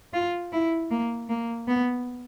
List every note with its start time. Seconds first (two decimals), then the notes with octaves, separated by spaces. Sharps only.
0.13 F4
0.52 E4
0.90 A#3
1.29 A#3
1.68 B3